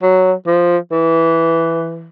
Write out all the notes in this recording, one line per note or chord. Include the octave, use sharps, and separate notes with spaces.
F#3
F3
E3